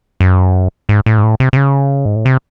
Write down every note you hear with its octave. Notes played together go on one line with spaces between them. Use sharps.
F#2
G#2
A2
G#2
A2
C3
C3
C#3
G#2
A2
C3